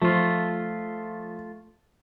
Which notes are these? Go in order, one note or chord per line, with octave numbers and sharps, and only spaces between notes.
F3 A3 F4